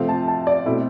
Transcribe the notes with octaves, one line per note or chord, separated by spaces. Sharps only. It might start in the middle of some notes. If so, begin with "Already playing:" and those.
Already playing: C3 F3 A3 C4 F5
A5
A5
D5
B2 A3 C4 E4